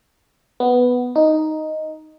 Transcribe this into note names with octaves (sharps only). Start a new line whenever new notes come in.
B3
D#4